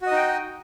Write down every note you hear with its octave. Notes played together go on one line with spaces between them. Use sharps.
D#4 F#4 D#5 G5